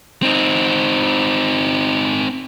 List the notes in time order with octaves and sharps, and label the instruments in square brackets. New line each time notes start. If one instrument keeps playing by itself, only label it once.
[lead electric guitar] C4 D#4